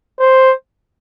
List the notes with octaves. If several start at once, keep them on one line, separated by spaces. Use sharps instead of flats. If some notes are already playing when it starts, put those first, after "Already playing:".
C5